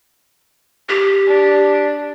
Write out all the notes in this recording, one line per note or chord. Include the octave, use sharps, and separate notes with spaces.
G4
D4